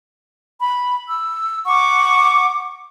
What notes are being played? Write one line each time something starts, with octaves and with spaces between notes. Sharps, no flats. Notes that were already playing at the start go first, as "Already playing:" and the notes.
B5
E6
F#5 C#6 D6